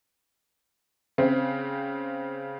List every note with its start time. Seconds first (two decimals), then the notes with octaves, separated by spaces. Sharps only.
1.18 C#3 C4